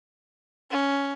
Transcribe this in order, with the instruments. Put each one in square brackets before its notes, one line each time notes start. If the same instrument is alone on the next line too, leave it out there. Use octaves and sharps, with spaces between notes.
[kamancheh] C#4